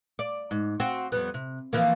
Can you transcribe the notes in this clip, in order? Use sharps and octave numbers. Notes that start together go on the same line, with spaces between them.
D5
G#2
C4 F#4
F2 G3 B3
C3
E3 F3 A#3